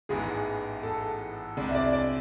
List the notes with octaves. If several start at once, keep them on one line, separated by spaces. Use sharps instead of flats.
A1 G#2 E3 G#3 B3 G#4
A4
C2 C3 G#3 D4
E5
D5
D5